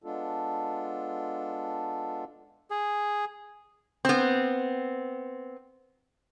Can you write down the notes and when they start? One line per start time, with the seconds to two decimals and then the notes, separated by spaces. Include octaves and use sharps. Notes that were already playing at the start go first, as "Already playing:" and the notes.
0.04 G#3 B3 D4 F4 A4
2.71 G#4
4.05 B3 C4